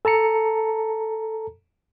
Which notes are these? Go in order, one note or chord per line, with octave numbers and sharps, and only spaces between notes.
A4 A5 A#5 C#7